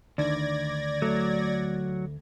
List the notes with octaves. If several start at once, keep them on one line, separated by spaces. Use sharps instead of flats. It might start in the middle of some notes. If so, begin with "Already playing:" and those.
D2 D#3 D4 D5 G#6 A#6
F#3 A3